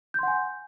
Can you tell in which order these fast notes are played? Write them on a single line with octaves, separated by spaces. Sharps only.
G6 C6 F#5 G#5